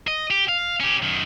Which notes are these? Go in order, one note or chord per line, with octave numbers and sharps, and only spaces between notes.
D#5
G4
F5
C#4 G4
F#2 D#3